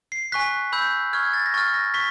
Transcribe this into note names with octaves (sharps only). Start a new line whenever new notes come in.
C7
G#5 C#6 F#6 B6
B5 E6 G6
C#6 F6 G#6
A6
A#6
C#6 F6 A6
A#6
C#6 B6